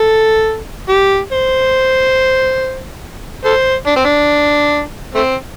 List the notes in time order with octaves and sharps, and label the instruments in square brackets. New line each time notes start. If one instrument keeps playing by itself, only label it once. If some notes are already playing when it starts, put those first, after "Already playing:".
Already playing: [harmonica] A4
G4
C5
A4 C5
D4
C4
D4
A3 C4